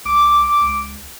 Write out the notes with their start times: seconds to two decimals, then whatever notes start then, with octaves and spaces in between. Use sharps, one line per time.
0.05 C2 D6
0.61 C#2